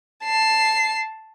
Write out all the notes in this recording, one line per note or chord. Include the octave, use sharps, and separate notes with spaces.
A5 C7